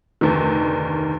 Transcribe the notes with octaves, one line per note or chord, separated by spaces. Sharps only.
F1 D2 D#3